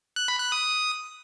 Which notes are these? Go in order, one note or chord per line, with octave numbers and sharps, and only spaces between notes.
F#6
B5
F#6
D#6